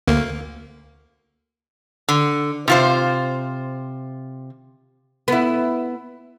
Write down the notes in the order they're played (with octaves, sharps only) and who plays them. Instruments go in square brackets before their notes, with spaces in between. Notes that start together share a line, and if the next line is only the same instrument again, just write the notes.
[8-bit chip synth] D2 A#3
[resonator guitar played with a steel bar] D3
C3 F4 C5
[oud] B3 E4